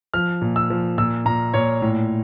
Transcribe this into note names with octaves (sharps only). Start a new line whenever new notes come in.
F3 F6
A#2
E6
F3
A#2 E6
A#2 A#5
A#2 C#5
A2